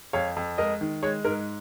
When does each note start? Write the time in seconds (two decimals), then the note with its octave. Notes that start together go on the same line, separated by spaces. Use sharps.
0.13 F2 C#5 F5
0.36 F2
0.58 G#3 A#4 D#5
0.81 D#3
1.03 G#3 C#5
1.25 G#2 A#4